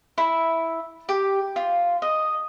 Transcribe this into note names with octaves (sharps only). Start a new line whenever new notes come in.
E4
G4
F4
D#5